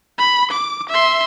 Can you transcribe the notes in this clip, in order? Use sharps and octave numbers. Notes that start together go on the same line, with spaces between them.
B5
D6
E5 C6